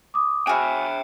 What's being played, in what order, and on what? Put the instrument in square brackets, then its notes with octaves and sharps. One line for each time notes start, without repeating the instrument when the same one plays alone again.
[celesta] D6 D#6
[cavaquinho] F#4 G#4 [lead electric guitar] E5 G5 [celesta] B5 F6 F#6